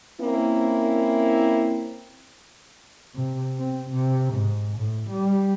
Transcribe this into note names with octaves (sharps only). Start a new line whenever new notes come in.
A#3 C4 C#4 E4
C3
C4
C3
G#2
A2
G3